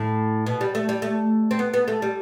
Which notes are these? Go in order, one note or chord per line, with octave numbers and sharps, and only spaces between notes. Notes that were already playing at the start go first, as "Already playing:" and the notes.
Already playing: A2
B2
G3
A3
G3
A3
C4
B3
B3
A3
G3